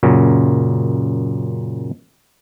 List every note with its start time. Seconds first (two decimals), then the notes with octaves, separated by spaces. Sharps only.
0.03 F#2 A#2 C#3